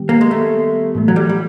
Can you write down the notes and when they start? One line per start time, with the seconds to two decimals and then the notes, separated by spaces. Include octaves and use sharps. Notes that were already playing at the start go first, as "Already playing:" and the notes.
Already playing: D#3 G3 B3 G4
0.09 A#3
0.21 G#3
0.31 A3
0.95 A2 E3 A3
1.08 F#3
1.16 G3
1.29 G3